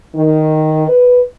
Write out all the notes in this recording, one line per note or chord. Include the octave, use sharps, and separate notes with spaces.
D#3
B4